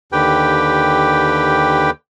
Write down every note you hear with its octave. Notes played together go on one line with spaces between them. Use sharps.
D#2 D3 G4 B4 G5